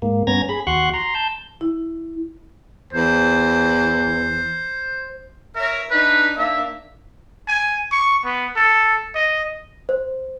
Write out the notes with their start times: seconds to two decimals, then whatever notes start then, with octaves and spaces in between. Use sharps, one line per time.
0.02 G#2 A#3
0.27 G2 B3 C#4 A#5 G#6 A#6
0.49 G#4 B5
0.67 D#2 F#4 F#5 C6 C#6 F#6
0.94 A#5 C6
1.15 A5 G6
1.61 E4
2.93 E2 C5
5.56 A#4 C#5 E5
5.91 D4 D#4 B4
6.37 A#3 D4 E5
7.48 G#5
7.92 C#6
8.25 B3
8.56 A4
9.15 D#5
9.89 C5